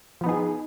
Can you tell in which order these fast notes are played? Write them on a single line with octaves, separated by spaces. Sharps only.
F3 B3 D#4 G#4